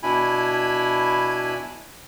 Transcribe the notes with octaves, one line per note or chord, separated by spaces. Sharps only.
B2 D4 E4 G#5 B5